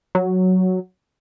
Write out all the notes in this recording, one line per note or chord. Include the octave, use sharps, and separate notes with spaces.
F#3